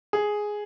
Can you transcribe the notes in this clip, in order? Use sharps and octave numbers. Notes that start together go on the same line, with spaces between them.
G#4